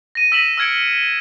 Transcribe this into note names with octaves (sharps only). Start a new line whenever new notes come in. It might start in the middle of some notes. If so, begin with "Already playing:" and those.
A#6 D#7
E6 A#6 B6 D#7 E7 F#7
E6 F6 G#6 C#7 D7